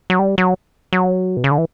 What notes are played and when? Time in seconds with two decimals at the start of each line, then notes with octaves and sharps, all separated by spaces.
0.10 F#3
0.19 G3
0.38 F#3
0.93 F#3
1.37 B2
1.44 C#3
1.51 D3
1.58 E3